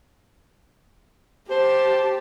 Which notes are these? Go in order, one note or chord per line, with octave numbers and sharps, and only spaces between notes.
G4 C5 A5